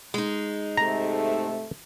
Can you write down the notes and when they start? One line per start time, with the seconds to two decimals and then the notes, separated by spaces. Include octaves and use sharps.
0.14 G#3 D#4
0.77 G#2 C3 A3 A#5